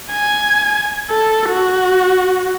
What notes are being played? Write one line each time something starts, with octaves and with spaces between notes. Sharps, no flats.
G#5
A4
F#4